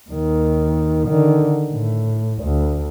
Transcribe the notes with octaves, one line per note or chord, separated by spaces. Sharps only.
D#2 D#3
D3 D#3
A2
D2